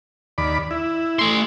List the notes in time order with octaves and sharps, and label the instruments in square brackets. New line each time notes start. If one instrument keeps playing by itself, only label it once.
[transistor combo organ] D#2 D5 B5
E4
[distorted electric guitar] A3 C6